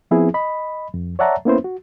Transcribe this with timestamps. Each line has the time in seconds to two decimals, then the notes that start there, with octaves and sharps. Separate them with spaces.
0.11 F3 B3 C4 E4 G#4
0.34 D#5 B5
0.94 F2
1.19 C#5 D5 E5 F#5 A5 A#5
1.45 A#3 B3 C#4 E4 B4 C5
1.64 F#4